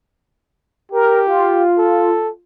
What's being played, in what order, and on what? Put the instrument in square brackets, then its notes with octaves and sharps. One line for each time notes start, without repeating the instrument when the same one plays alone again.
[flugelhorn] G4 [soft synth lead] A#4
[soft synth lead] F4
[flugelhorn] A4